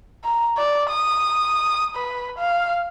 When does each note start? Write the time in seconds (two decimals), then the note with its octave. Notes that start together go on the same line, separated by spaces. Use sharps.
0.24 A#5
0.57 D5
0.89 D#6
1.96 B4
2.38 F5